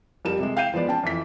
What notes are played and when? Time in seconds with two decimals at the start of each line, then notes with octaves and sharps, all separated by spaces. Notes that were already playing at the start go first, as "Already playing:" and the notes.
0.25 F2 G3 A#4 E7
0.39 C3 G#3
0.57 F5 G5 G6 C7 D#7 E7
0.74 F3 G#3 B3 D5
0.88 C#4 G5 A5
1.04 F2 E3 B6